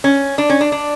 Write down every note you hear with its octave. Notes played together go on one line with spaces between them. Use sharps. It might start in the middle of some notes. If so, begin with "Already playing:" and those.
C#4
D4
C#4
D4
D4